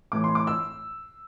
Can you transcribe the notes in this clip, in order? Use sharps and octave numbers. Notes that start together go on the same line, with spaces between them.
A2 E3 D6
C6
D6
E6